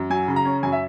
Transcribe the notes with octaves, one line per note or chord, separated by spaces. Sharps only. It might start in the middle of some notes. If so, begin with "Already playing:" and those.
Already playing: F#2
F#3 G#5
C#3
A#5
C#4
F#2 G#5
E5